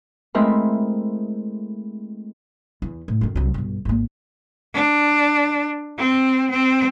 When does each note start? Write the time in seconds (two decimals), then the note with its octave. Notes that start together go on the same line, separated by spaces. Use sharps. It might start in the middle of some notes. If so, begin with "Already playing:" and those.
0.35 G#3 A3 C4 E4 A#4 B5
2.82 E2
3.08 A2
3.21 F#2 D#3
3.36 C2 F#3
3.54 B1 G2
3.85 G#1 A#3
4.74 D4
5.98 C4
6.50 C4